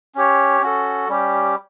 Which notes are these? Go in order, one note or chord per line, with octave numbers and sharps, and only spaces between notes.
C#4 G4 C#5
C#4 F#4 A4
G3 C#4 G4